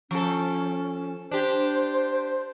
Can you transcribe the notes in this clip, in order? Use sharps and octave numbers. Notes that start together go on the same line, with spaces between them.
F3 C#4 A4
D4 G4 C5